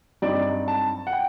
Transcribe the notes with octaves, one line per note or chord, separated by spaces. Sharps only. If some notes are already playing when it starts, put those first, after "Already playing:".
G2 F#3 C4 D#4 D5
A5
F#5
G5